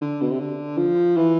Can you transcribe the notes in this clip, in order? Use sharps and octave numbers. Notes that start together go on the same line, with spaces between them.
D3
B2
C3
D3
F3
E3